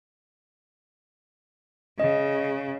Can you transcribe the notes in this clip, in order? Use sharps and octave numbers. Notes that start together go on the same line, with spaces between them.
C#3 D#5